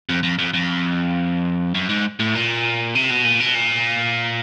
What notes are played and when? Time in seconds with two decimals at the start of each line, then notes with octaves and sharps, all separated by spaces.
0.09 F2
0.23 F2
0.39 F2
0.54 F2
1.74 F#2
1.89 G#2
2.20 A2
2.35 A#2
2.95 C3
3.10 B2
3.25 A#2
3.40 B2
3.55 A#2